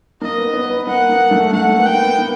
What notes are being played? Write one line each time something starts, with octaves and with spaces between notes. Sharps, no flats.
A#3 D#5
B3
B3
B3
A#3 F#5
A#3
A3
A3 F#5
A#3
B3
A#3 G5
B3
A#3